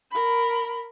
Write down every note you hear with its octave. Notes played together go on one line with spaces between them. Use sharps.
A#4 B5